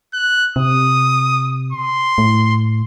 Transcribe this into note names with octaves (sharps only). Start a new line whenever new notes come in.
F#6
C3 D#6
C6
A2